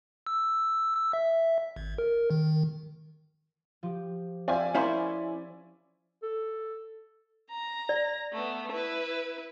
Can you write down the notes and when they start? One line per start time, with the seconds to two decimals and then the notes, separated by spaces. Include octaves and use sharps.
0.27 E6
0.95 E6
1.13 E5
1.76 G#1
1.98 A#4
2.30 D#3
3.83 F3 G4
4.48 C4 F4 D5 E5 F5 G#5
4.75 F3 C#4 E4 A#4 C5
6.23 A4
7.50 A#5 A#6
7.89 D5
8.33 A3 B3
8.72 E4 B4